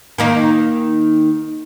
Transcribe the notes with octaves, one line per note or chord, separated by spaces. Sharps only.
D#3 A#3 D#4